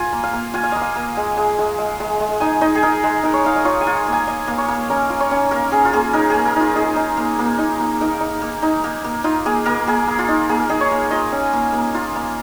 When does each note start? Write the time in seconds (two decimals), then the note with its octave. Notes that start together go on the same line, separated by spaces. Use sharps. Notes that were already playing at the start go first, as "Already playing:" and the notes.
Already playing: F4 G#5
0.12 A#3
0.24 F5
0.33 A#3
0.54 F4 G#5
0.64 F5
0.72 A#3 D#5
0.82 F5
0.96 A#3
1.17 G#3
1.37 G#3
1.59 G#3
1.78 G#3
2.00 G#3
2.20 G#3
2.40 D#4 G#5
2.61 D#4 D#5
2.75 G#4
2.83 D#4 A#4
3.04 G#3
3.23 D#4 A#4
3.34 C#5
3.44 D#4 F5
3.56 D#5
3.65 F4 C#5
3.81 G#5
3.87 F4
4.07 A#3
4.12 G#5
4.27 A#3 D#5
4.48 A#3
4.58 C#5
4.68 A#3
4.90 C#4 A#4
5.10 F4
5.20 C#5
5.31 C#4
5.51 A#3 A#4
5.72 C#4 G#4
5.85 F4
5.93 A#3 G#4
6.13 D#4 A#4
6.30 A#3 G#4
6.45 A#4
6.56 D#4 F4
6.75 D#4 G#4
6.96 D#4
7.17 A#3
7.39 A#3
7.58 D#4
7.80 A#3
8.01 D#4 A#4
8.21 D#4
8.42 A#3
8.62 D#4
8.84 A#3
9.04 A#3
9.24 D#4 F4
9.46 A#3 G#4
9.66 A#3 A#4
9.87 A#3 G#4
10.07 A#3
10.19 F4
10.28 D#4
10.49 A#3 G#4
10.60 A#4
10.70 D#4 G#4
10.81 C#5
10.91 A#3
11.11 F4 D#5
11.32 C#4
11.53 A#3
11.73 A#3
11.94 F4
12.15 A#3